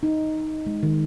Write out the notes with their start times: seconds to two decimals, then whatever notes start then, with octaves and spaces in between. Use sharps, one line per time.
0.03 D#4
0.66 G#3
0.83 D#3